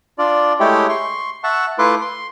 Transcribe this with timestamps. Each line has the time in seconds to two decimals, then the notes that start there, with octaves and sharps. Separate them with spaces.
0.18 D4 F4 D5
0.60 G#3 A3 E4 G4 C#5 G5
0.89 C6 C#6
1.44 E5 F#5 A5 C#6
1.79 A3 E4 F4 B4 C6 D6
2.01 C6